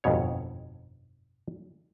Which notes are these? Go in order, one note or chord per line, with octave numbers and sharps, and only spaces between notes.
G1 F2 G#2 B2 C#5